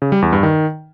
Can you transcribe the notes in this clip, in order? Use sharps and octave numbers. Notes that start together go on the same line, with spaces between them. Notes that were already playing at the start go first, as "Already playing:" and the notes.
C#3
G3
E2
G2
D#3